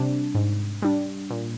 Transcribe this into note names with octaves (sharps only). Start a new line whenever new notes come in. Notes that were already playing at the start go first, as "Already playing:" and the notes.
Already playing: C3 G3 D4
G#2
G3 D4
A#2